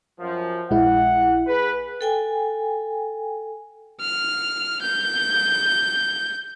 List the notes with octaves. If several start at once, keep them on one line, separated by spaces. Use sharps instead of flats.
F#2 F3
A#1 G#3 E4 F#5
G#4 B4
A4 G5 G#5
F6
G6